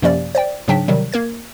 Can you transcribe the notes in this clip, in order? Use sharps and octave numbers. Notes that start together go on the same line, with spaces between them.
F#2 C3 F3 A#3 C#4 D5
C5 D5 G5
G#2 C#3 F#3 D4 G5 B6
C3 D#3 F#3 G3
A#3 A#4 G#6